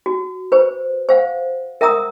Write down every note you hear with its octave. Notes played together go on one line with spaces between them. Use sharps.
F#4
B4 C5
C5 F5 F#5
A#4 E5 F#5 A#5 D#6 E6